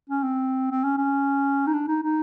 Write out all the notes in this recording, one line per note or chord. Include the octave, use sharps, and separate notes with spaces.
C#4
C4
C4
C#4
C#4
D#4
D4
D#4
D#4